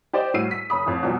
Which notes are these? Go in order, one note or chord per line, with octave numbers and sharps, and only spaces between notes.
G4 C5 D5 D#5 G5
A2 G3 F#4 E6 C7 D#7
B6
F#1 B5 D#6
A1 F2
E2 B2 F3 G3 F#4